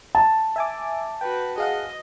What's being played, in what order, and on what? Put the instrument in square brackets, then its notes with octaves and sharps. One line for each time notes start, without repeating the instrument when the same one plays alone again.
[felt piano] A5
[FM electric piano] E5 G#5 D6
[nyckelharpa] F#4 B4 [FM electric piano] G5
[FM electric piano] G#4 F5 F#5 [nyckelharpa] D#5